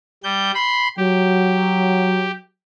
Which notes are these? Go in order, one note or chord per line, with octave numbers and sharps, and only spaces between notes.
G3 G6
B5 C6
F#3 G4